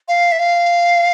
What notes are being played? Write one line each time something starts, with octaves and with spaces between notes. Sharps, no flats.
F5
E5
F5